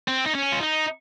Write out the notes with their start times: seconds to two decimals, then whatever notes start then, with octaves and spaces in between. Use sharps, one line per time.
0.08 C4
0.26 D#4
0.35 C#4
0.52 F4
0.61 D#4